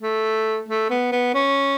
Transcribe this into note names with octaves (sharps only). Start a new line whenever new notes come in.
A3
A3
B3
B3
C#4